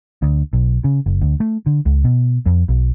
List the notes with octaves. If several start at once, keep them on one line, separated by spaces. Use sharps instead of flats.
D2
B1
C#3
F#1
D2
A3
D3
C#2
B2
F2
B1